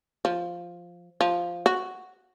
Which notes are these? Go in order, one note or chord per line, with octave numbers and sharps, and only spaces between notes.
F3
F3
F#4